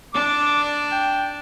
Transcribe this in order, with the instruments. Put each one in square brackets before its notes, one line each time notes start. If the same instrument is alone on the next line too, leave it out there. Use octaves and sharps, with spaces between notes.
[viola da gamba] D4 [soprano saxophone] D6
[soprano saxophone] G5